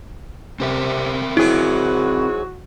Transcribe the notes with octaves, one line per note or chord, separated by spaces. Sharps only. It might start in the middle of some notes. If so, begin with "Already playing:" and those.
C3 C4 A#4 E5
G#2 F#3 E4 F#4 G#4